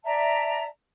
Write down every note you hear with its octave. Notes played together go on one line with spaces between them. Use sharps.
D5 E5 A5 A#5